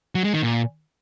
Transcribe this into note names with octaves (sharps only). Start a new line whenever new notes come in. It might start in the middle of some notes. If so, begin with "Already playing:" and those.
F#3
G#3
D#3
A#2